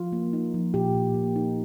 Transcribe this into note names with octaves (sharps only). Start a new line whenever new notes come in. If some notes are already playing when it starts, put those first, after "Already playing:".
Already playing: F3 F4
A#3
D#4
F3
A#2 G4
A#2
A#3
D#4